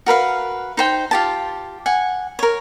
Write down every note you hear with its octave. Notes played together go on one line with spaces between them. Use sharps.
F#4 A#4 B4 F5
D#4 C5 G5
F4 G4 A5
F#5 G#5
A#4 C#5